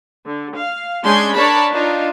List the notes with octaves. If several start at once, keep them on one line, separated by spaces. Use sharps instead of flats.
D3
F5
G#3 C#4 D4 C6 G6 G#6
D4 A#4 C#5 D5 A5 B5
D4 D#4 F4